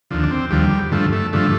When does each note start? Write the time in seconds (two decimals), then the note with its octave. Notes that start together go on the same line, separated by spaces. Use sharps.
0.11 D#2 D3 F3
0.23 D4
0.31 C4
0.51 D#2 D3 F3 G3
0.91 G2 D3 F3 A3
1.12 A3
1.33 G2 D3 F3 A3